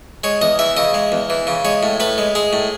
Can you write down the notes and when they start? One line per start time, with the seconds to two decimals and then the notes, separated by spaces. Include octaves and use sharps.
0.24 G#3 C#5
0.42 E2 D#5
0.59 E3 E5
0.77 C#3 D#5
0.94 G#3
1.12 E2
1.30 E3
1.47 C#3
1.65 G#3 C#5
1.83 A2
2.00 A2 B4
2.18 G#3
2.35 G#3 G#4
2.53 A2